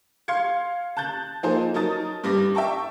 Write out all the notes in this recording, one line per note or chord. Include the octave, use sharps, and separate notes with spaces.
F5 C6 G#6 C#7
A5 F#6 G6 A6
F3 A#3 D#4 G#4 A4 C5
F#3 D#4 A#4 A5 D#6 A6
G2 G3 D6 A#6
E5 G5 A5 C#6